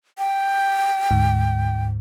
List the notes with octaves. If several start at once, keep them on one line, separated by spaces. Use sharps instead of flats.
G5
D2 G#2